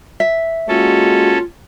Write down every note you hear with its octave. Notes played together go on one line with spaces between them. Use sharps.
E5
G#3 A#3 C#4 F4 F#4 A4